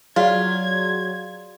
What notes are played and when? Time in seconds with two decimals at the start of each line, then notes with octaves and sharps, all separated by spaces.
0.16 F#3 F4 G#4 D5 F5 G#6